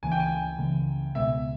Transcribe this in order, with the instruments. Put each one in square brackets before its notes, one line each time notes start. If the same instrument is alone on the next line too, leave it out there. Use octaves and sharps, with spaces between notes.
[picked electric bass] C#2 C#3 E3 A#3 [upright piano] G#5
[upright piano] G5
G#5
[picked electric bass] C#2 C#3 E3 A#3
[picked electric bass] C#2 B2 G#3 B3 [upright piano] E5